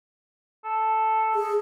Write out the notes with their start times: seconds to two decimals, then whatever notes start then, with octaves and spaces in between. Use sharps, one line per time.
0.65 A4
1.35 G#4